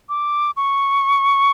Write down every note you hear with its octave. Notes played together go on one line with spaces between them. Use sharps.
D6
C#6